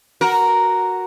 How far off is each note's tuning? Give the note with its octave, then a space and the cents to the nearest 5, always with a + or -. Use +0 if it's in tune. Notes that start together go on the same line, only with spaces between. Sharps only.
F#4 +0 A#4 +0